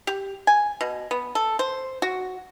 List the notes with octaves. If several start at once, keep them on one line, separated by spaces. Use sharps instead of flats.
G4
G#5
B2
B3
A4
C5
F#4